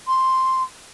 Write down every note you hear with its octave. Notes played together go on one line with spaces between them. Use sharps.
C6